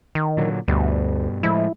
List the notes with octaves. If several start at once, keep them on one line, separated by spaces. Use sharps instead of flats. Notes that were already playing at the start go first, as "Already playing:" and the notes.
D#3
A#2 D3 F#3
D2 G2 B2 G3
A2 F3 G#3 E4